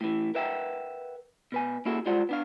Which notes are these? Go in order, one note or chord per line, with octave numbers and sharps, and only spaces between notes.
A2 E3
A#4 B4 E5 F#5 G5
B2 B4 G#5
A#3 C#4 E4 F#4 G#4 A4
G3 G#3 F4 C5 D5 F#5
B3 D4 F5